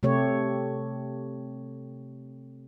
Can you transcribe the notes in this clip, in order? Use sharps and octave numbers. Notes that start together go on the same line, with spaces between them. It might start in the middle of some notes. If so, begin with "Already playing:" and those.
C3 A3 G4 C#5